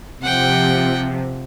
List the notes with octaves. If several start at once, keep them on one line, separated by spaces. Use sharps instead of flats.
C3 F3 F#5 G5